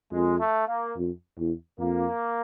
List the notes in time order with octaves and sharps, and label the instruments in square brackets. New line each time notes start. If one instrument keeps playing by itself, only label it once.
[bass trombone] F2 [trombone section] G#3
[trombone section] A3
A#3
[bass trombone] F2
E2
[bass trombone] F2 [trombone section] A#3